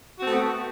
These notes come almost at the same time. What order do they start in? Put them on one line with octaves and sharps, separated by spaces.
F#4 C4 A3 B3